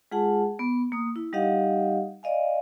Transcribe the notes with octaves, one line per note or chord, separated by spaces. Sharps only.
G#3 F4 G#4 F#5 A5
B3
A#3 D#6
E4
G3 D#4 G4 D#5 F5 F#5
D5 D#5 F5 G#5